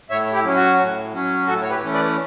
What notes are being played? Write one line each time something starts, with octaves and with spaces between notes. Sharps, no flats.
A2 C#5 E5
E4 G4
F#3 C#4
F#4
A2
F#3 C#4
A2 F#4 A4
C#5
G4 B4
E3 A3 C#4
B4 D5